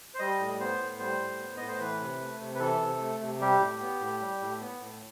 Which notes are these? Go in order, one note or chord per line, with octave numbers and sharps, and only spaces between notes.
C5
G3 D#5
A2
B3 C5
A2
G3 C5
A2
B3
A2 D#5
C5
E3 B4
C3
A3
C3
B4
E3 A4
C3
A3
C3
G3 G4
A2
B3
A2
G3
A2
B3
A2